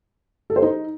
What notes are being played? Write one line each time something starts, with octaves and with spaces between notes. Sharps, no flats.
A4
C5
D#4